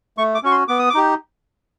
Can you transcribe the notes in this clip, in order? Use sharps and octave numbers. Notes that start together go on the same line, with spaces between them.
A3 C#6
D6
C#4 F#4 C#6
C6
B3 D6
D#6
D6
D#4 G4